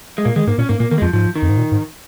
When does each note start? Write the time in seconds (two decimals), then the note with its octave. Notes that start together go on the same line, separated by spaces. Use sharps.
0.18 G#3
0.25 A#2 A#3
0.36 D#3 G#3
0.47 G#2 A#3
0.58 A#2 C#4
0.69 G#2 A#3
0.80 A#2 A#3
0.91 D#3 A#3
0.98 G#3
1.02 F2 F3
1.13 G#2 F3
1.36 D#3
1.42 F2
1.50 G#2
1.57 A#2
1.72 G#2